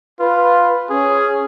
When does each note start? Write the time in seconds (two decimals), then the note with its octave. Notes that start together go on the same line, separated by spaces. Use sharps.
0.19 F4 B4
0.89 C#4 G#4